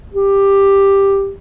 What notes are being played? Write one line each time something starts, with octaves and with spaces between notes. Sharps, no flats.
G4